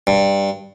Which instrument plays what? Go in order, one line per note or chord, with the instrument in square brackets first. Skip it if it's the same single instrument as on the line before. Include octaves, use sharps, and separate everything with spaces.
[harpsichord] G2